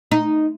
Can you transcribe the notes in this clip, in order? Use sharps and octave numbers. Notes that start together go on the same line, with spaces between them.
D#4